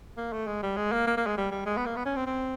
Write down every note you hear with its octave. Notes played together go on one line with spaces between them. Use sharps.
A#3
A3
G#3
G3
G#3
A#3
A#3
A#3
G#3
G3
G3
G#3
B3
A#3
B3
C#4
C4
C4